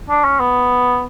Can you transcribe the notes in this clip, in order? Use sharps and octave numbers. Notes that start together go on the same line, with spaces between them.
D4
C#4
B3